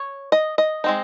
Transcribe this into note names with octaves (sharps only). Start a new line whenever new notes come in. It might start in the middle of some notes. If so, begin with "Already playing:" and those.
Already playing: C#5
D#5
D#5
G#3 C4 D#4